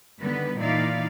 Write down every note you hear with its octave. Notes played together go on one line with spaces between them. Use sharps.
D3 D#3 G3 B3 B4
A#2 E3 D#4 E4 D5 F5